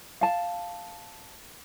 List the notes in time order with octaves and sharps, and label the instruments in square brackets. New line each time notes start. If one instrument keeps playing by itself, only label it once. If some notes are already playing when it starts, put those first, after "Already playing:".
[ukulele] F5 A5